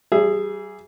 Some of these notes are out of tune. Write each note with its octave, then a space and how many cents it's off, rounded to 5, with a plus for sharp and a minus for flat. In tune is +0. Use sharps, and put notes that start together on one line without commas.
G3 -35 G#4 +0 E5 +25